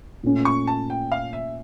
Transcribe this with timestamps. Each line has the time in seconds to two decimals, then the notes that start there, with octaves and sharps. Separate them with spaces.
0.23 A#2 A3 C#4
0.45 C#6
0.67 A5
0.90 G5
1.12 F5
1.33 E5